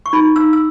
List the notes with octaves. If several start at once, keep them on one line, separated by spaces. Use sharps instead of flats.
C#6
D#4 B5
D#4 E6
E6